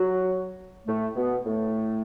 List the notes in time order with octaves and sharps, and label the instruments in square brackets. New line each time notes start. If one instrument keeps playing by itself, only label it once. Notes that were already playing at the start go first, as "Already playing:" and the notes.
Already playing: [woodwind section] F#3 F#4
A2 A3
B2 B3
A2 A3